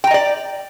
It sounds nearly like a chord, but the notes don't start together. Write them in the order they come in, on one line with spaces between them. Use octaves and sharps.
G5 A#5 D#5 D5